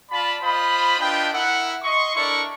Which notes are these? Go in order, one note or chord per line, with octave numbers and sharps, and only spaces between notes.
F4 D5 A5 B5
F4 C5 D#5 B5
D4 F4 B4 D#5 G5
E4 A#4 E5 F#5
D#5 C6 C#6
D4 E4 A4 A#4 D5 C#6